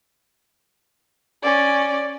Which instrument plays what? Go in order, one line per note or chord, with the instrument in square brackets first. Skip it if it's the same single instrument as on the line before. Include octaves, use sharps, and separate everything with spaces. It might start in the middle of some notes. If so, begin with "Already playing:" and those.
[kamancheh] C#4 D5